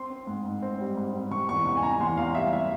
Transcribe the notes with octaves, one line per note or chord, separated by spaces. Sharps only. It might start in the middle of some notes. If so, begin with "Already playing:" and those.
Already playing: C4 C6
C4
G#2
G#2
C4
G3
G#2
C4
C3 C#6
E2 C#6
C3 C#6
G#5
C3 A#5
E2 C6
E2 F5
G3 E5
C3 E5